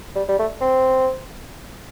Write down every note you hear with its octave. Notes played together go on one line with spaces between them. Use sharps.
G3
G3
A3
C4